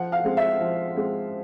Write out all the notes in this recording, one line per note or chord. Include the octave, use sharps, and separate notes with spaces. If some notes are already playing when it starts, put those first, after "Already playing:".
Already playing: F3 F#5
F5
G#3 C4
E5
F3
G#3 C4